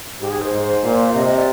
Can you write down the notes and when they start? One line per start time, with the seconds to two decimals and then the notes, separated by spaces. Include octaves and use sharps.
0.20 G#2 G4
0.30 G#4
0.41 C5
0.51 G#2
0.84 A#2
1.10 F5
1.15 C3 D#5
1.26 D#5
1.36 D5